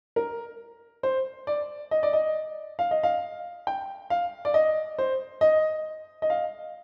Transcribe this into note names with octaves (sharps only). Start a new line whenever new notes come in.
A#4
C5
D5
D#5
D5
D#5
F5
D#5
F5
G5
F5
D5
D#5
C5
D#5
D#5
F5